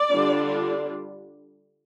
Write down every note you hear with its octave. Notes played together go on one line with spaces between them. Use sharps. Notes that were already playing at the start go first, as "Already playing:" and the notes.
Already playing: D5
D3 G3 D4 F4